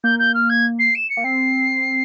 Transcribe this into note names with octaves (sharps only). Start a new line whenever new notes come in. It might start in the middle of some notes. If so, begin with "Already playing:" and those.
A#3 G6
G6
F6
G#6
C7
E7
C#7
A#3
C4 C7